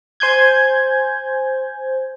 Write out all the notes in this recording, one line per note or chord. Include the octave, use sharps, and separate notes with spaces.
C5 G#5 G6 G#6